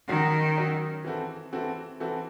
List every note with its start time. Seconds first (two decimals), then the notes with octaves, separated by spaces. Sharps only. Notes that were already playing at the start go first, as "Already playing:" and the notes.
0.08 D#3 F#3 C#4 F#4
0.57 F#3 C#4 F#4
1.05 E3 C4 F#4 A4
1.53 E3 C4 F#4 A4
2.00 E3 C4 F#4 A4